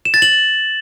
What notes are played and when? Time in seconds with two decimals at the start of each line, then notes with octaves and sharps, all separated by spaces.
0.05 E7
0.14 A6
0.22 F#7